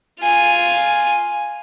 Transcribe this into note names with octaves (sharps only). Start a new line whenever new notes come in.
F4 G#5